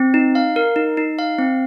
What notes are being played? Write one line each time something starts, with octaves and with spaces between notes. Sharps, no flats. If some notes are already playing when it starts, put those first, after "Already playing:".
Already playing: C4
D#4
F5
A#4
D#4
D#4
F5
C4